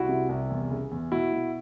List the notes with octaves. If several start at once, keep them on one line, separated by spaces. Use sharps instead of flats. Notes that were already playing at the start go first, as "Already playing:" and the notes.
Already playing: C2 E4 F#4
C3
C2
E2
C#3
E2
B2 E4 F#4
B2